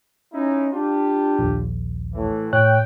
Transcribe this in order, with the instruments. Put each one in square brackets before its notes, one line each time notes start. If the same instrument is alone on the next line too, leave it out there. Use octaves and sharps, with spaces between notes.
[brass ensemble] C#4 D#4 E4
D4 F4 G4
[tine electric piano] A#1 D#2
[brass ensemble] A2 E3
[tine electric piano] A2 C#5 F#6 [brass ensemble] G5